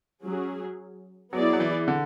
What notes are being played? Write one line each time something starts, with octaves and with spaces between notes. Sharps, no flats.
F#3 C#4 G#4
F#3 B3 E4 G#4 D5
F#3
E3
D3